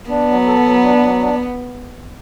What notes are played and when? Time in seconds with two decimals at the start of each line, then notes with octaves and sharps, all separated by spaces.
0.10 B3 D4
0.29 F#3
0.47 A4
0.65 F#3
0.84 D4
1.03 F#3
1.21 D4